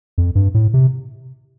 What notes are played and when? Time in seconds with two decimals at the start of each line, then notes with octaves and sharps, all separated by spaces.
0.18 F2
0.35 G2
0.54 A2
0.74 C3